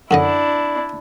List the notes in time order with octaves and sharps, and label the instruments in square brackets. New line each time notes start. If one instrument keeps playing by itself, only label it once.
[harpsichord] F#2 D3 D#5 [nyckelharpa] D4 E4